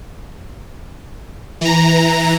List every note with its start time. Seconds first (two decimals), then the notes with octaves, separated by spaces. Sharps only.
1.61 E3 A#5